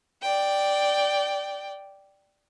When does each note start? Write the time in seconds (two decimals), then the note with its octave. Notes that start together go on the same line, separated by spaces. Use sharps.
0.22 D5 G5